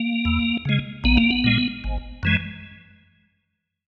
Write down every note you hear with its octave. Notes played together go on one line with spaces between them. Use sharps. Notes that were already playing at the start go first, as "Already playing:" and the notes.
Already playing: A#3
E2
C#3 G#3
A#1 B3
A#3
B3
A#2 G#3
G#1
F#2 E3 G#3